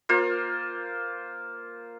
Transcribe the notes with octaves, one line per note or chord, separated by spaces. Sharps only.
A#3 F4 C5